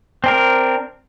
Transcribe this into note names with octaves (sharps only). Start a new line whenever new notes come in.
C4 D4 A#4